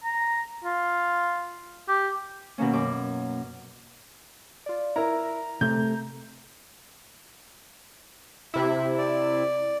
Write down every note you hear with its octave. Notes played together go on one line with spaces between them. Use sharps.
A#5
F4
G4
B2 D#3 A#3 C#4
F#2 D6
F4 D5
E4 A#4 A#5
C3 A3 G6
C3 E4 E5
D5